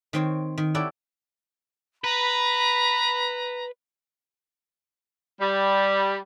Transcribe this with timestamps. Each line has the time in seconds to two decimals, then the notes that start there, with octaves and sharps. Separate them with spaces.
0.13 D#3 C4 C#5
0.58 D#3
0.75 E4 G4 A4 C#5 D5 F#5
2.04 B4 A#5 B5
5.39 G3